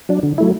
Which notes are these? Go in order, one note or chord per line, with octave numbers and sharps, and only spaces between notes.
F#3 D4
D3
F#3 A3 E4